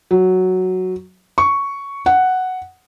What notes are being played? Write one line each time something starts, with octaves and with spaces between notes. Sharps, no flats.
F#3
C#6
F#5